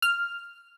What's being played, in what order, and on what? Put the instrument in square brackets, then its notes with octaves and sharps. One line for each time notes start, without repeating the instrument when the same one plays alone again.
[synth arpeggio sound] F6